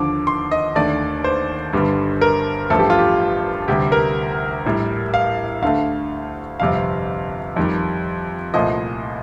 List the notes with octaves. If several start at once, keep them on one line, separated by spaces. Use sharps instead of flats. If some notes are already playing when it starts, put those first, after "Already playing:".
Already playing: D#2 D3 F3 D6
C6
D#5
D#2 D3 A3 D5
C5
G1 G2 D3 G3
A#4
A1 G2 F3 A3 A4
G4
F4
G4
D2 C3 G3 G4
A#4
A#1 A2 G3
F5
D2 D3 A3 F5
G1 F2 C3 G3 F5
F2 D#3 G3
C2 A#2 F3 A3 D#5